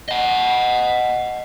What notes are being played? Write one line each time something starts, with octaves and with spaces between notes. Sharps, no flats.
D#5 F#5